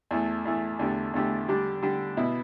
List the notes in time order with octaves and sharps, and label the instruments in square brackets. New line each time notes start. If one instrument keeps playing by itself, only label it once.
[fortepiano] E2 E3 A3
E2 E3 A3
E2 D3 A3 G4
E2 D3 A3 G4
D3 G3 D4 G4
D3 G3 D4 G4
B2 B3 E4